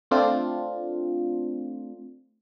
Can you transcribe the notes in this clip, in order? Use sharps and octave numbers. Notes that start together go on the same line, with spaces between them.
A3 C4 D4 F4